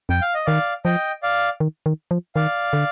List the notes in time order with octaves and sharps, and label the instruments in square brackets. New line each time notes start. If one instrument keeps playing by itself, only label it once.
[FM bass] F2 [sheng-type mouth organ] G5
[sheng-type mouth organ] F5
D#5
[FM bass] D#3 [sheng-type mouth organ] D5 F5
[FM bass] F3 [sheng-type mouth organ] D#5 G5
[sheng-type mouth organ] D5 F5
[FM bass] D#3
D#3
F3
[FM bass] D#3 [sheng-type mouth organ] D5 F5
[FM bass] D3